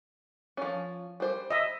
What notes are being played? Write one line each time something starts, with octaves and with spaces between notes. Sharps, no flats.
F3 C#4
G3 C5
D#5 E5